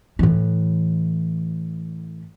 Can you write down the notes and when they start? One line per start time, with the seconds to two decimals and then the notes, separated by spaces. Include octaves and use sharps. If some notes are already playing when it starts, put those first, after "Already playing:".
0.19 A2 E3